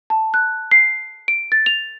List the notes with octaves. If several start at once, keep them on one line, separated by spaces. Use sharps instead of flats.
A5
F#6
C7
D7
A6
F7